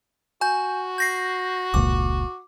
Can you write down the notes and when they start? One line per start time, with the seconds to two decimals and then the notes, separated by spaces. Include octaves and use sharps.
0.41 F#4 G#5 G6
0.98 G6 A#6 C7
1.74 F1 C#2 A#2 D6